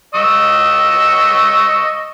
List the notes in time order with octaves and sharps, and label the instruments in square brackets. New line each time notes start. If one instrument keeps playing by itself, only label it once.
[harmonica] D#5 C#6 E6